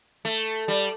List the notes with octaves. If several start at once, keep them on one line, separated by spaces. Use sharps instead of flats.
A3
G3